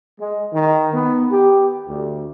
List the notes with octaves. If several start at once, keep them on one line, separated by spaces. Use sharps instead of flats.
G#3
D#3
B3
G4
D2